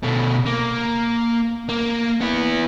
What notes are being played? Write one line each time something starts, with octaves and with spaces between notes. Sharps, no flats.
B2 A3
A#3
A#3
B3 E4